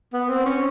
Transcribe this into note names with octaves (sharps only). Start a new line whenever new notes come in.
B3
C4
C#4